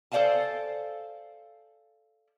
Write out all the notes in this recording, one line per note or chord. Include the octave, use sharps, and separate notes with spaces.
A4 C5 D5 F5 G#5 A5